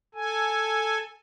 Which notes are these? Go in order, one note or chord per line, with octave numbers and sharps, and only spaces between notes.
A4 G#5